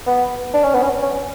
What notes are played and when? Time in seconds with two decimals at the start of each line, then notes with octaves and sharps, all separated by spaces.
0.07 B3
0.54 D4
0.63 C#4
0.74 B3
0.83 C#4
1.02 C#4